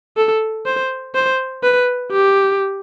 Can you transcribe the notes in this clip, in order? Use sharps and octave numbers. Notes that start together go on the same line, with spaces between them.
A4
C5
C5
B4
G4